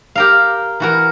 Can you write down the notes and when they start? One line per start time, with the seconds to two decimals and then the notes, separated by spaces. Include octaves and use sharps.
0.15 G4 A#4 F5
0.80 E3 F#4 A#4